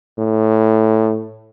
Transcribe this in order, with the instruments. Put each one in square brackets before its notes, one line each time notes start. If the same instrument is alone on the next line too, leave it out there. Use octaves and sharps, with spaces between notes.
[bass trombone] A2